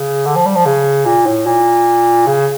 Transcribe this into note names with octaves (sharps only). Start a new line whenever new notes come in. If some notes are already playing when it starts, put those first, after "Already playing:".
Already playing: C#3
D3
F3
G3
F3
C#3
A#2
A2
A#2
C#3